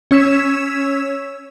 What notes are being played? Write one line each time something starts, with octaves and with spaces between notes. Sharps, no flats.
C#4 C#5 E6 G#6 B6 E7